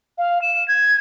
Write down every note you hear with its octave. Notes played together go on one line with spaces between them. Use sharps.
F5
E7
G#6